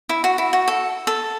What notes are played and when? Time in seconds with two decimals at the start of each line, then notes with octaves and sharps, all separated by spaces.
0.09 E4
0.24 F#4
0.38 E4
0.53 F#4
0.68 A4
1.07 A4